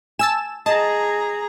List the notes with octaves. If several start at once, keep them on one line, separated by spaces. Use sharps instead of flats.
G#5 A5 E6 E7
G#4 D#5 A5 A#5